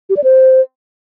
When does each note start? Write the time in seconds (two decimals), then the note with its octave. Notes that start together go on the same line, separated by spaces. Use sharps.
0.09 G4
0.17 D5
0.24 C5